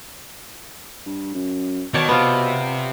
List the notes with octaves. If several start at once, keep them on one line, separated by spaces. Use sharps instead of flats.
G2
F#2
B2 D#3 C#5 D5 A5
C3 B3 F4